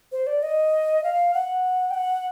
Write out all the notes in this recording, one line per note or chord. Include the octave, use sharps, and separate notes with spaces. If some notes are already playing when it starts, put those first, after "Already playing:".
C5
D5
D#5
F5
F#5
G5
F#5